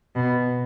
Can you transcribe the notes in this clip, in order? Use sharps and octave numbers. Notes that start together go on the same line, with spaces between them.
B2